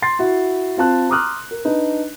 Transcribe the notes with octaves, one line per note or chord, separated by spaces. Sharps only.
C6 A6 C7
E4 F#4
C4 F4 A5 F#6
A#5 C6 D6 D#6 F6 F#6
A#4
D4 D#4 B4